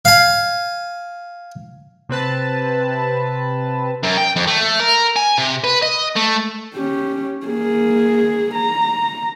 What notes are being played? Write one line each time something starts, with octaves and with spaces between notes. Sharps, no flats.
F5 G#5
C3 C4 B4 A5
F#2
G5
F2
A3
A#4
G#5
C3
B4
D#5
A3
C#4 G4
A#3 G#4
A#5